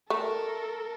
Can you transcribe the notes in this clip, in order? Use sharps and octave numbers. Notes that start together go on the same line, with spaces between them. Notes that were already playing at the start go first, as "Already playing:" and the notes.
A3 A4 A#4